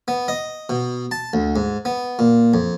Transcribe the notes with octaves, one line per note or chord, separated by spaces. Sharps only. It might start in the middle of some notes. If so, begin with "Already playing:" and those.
B3
D#5
B2
A5
D2
G#2
B3
A#2
F2